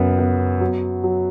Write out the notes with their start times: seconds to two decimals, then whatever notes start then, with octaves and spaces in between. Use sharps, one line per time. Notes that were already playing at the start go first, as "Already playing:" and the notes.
Already playing: F#2 C#3 B3
0.19 B3
0.61 F#3
1.04 F#3